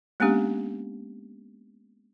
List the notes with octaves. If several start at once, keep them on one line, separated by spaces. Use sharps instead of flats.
G#3 A#3 B3 C#4 D4 G4